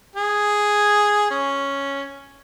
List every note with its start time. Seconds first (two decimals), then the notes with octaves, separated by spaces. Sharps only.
0.16 G#4
1.31 C#4